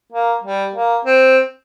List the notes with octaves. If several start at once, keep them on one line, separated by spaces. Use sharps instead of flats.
A#3
G3
A#3
C4